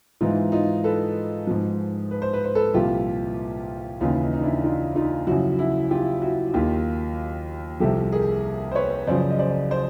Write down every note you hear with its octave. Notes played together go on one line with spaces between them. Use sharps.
G#2 E3 D#4 F4
D#4 F4
A4 B4
G#2 F3
B4
C5
B4
C5
A4 B4
C2 A#2 F3 F4 G4
D#2 C#3 E3 D#4 F4
D#4
D#4
D4 E4
D#4 F4
D#4 F4
F#2 C#3 F3 E4 F#4
E4 F#4
F4 G4
E4 F#4
D#2 D#3 F4 G4
C2 C3 F3 G4 A4
G#4 A#4
C5
B4 C#5
F#2 C#3 F3 C5 D5
D#5
C5 D5
C5 D5